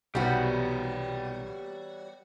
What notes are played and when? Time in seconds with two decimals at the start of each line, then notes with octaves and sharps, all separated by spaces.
0.15 B1 C3 G3 B3 F#4 G4 C#5 D5